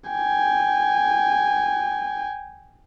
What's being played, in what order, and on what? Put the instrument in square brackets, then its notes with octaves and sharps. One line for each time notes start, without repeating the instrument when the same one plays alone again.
[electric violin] G5 G#5